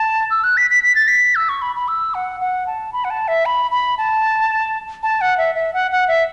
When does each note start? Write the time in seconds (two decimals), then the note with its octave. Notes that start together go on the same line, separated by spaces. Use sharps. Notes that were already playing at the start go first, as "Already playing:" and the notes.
Already playing: A5
0.31 E6
0.44 F#6
0.57 B6
0.70 B6
0.84 B6
0.95 A6
1.08 B6
1.35 E6
1.49 C#6
1.62 B5
1.76 B5
1.88 E6
2.14 F#5
2.41 F#5
2.67 A5
2.93 B5
3.04 F#5
3.10 A5
3.28 E5
3.46 B5
3.71 B5
3.98 A5
5.03 A5
5.21 F#5
5.38 E5
5.55 E5
5.74 F#5
5.91 F#5
6.08 E5